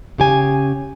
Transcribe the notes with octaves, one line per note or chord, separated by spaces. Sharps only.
C#3 G4 G#5